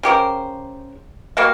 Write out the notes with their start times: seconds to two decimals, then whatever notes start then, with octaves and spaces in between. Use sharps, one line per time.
0.03 C#3 G4 A#4 C5
1.37 G3 A#3 F#4 F5